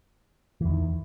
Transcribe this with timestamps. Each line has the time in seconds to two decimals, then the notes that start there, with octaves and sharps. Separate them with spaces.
0.61 E3
0.65 E2
0.70 D#3